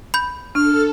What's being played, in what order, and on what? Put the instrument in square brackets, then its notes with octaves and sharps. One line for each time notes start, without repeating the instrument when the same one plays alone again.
[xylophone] B5 G6
[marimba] D4 [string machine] A4 [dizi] F6